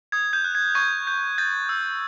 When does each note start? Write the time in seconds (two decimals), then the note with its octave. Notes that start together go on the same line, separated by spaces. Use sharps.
0.12 D#6 G#6
0.33 G6
0.44 F#6
0.55 G#6
0.75 C#6 G#6
1.07 G6
1.38 G6 A6
1.69 E6